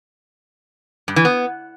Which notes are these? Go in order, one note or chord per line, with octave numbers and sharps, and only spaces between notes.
G2
E3
B3